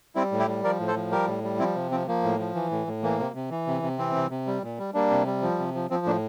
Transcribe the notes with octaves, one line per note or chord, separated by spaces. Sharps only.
G3 C4 E4
A2
E4 G4
G3
F3 A#4 D5
A2
A4 C5
F3
G3 G4 A#4
A2
G3
F3 C4 E4
C3
F3 C4
F3 A#3
A2
F3
E3
A2
A2
E3 A#3
C3
C3
E3
C3
C3
E3 C4
C3
C3
G3
A#2
G3
G3 A#3 D4
C3
G3
F3
C3
F3
F3 C4
A2 A#3 D4